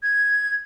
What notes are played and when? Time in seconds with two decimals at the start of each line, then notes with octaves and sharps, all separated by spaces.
0.03 G#6